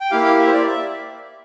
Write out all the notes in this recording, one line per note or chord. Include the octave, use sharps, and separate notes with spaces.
G5
A#3 E4 G4 F5
F5
E5
C5
D5
E5